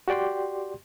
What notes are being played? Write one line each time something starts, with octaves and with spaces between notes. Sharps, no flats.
F#4 G4 D5 G5 C6